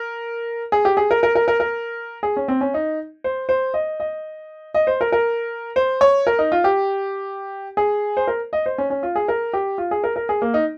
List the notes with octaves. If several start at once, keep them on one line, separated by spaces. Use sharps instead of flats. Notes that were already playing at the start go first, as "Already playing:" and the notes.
Already playing: A#4
G#4
G4
G#4
A#4
A#4
A#4
A#4
A#4
G#4
C#4
C4
C#4
D#4
C5
C5
D#5
D#5
D#5
C5
A#4
A#4
C5
C#5
A#4
D#4
F4
G4
G#4
C5
A#4
D#5
C5
C#4
C#4
F4
G#4
A#4
G4
F4
G#4
A#4
A#4
G#4
A#3
D#4